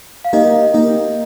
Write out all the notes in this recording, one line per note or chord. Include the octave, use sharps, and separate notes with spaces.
F5
A#3 D#4 G4 A#4 D#5
A#3 D#4 G4 A#4